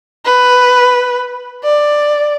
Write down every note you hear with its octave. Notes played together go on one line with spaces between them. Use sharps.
B4
D5